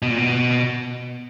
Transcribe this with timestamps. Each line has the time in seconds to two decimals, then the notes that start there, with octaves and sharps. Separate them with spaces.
0.02 B2
0.10 A#2
0.18 B2